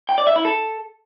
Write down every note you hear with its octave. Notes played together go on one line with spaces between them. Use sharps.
G5
D5
E5
E4
A4